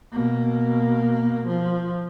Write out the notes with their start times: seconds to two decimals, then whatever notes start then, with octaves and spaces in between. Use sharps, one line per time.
0.13 B2 A#3
1.47 F3